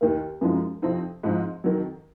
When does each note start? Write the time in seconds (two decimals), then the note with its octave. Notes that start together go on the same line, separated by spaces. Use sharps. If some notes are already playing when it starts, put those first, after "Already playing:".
0.01 D#2 D#3 A#3
0.41 F#2 F3 G#3 D#4
0.82 F2 C3 F3 C4 D#4
1.23 G#2 F3 C4 D#4
1.64 F2 D#3 F#3